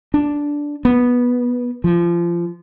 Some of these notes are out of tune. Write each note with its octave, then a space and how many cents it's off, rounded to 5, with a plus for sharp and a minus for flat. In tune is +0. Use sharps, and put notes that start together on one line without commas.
D4 -5
B3 -10
F3 -25